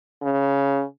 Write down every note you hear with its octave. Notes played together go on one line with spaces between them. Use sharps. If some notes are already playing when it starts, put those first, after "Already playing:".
C#3